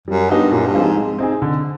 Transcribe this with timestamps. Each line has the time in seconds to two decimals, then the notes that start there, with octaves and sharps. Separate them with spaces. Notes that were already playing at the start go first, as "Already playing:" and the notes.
0.08 F#2 G3
0.30 G2 B3 D#4 F#4
0.52 F#2 A#2
0.67 G2
0.74 F3 G#3 C4 F4
0.82 G#2
0.97 G#3
1.19 C4 D#4 G#4
1.42 D3